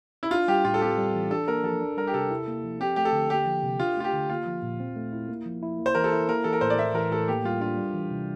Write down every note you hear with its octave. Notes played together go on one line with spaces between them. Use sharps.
E4
D4 F4
G3 G4
A2 F4
A4
C4 G4
G3
E3
D4 A4
A#3 A#4
F3 A4
D4
G3 A#4
G4
C3 A4
E4
A#3
F3
C4 G4
A3 G4
A4
D3
A#3 G4
F3
C3
D4 F4
A3 F4
G4
D3
A#3 F4
F3
A#2
C4
A3
E4
A#3
F3
E4
A#3
C5
E3 A#4
A4
E4
A#3 A#4
E3 A4
A#4
A2 C5
D5
A3 E5
E3 A#4
A2 A4
A#3 G4
G3 F4
D4 F4
G3
E3
C3